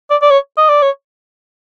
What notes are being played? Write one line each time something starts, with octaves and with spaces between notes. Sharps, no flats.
D5
D5
C#5
D#5
D5
C#5